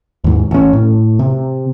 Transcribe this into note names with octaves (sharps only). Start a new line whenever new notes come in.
D#2 G#2
A1 C#4
A2
C3